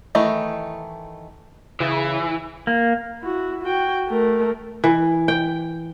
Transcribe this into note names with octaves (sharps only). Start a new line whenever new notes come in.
D#3 E3 A3 D#4
C#3 E3
A#3
E4 F#4
F#4 G5
A3 A#4
E3
G5